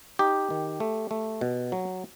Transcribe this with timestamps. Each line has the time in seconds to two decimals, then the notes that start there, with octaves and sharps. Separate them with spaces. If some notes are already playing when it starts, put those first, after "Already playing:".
0.19 D#4 G4
0.50 D#3
0.80 A3
1.11 A3
1.41 B2
1.72 F#3